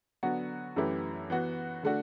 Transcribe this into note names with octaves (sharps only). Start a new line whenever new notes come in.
D3 F#3 B3 F#4
F#2 E3 A3 E4 G4
E3 B3 F#4
D3 A3 D4 F#4